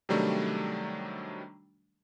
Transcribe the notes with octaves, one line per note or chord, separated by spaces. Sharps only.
C3 D#3 F#3 G3 A3 D4